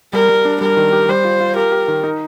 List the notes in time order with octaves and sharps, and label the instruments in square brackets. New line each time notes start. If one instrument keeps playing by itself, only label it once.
[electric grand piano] G3 [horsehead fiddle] A#4
[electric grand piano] G3
D4
[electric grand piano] G3 [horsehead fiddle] A#4
[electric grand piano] D#3
G4
[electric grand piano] G3 [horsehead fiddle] C5
[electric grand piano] F4
F4
[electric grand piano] G4 [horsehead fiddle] A#4
[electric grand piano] G4
D#3
D#4